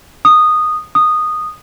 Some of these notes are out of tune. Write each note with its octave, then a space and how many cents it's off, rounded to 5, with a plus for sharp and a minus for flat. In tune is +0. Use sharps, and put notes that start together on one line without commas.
D#6 -10
D#6 -10